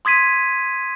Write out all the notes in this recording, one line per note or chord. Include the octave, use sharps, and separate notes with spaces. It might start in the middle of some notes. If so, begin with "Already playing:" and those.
C6 D#6 G#6 B6 D#7